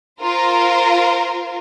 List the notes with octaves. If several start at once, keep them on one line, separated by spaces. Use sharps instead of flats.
F4 A#4 C5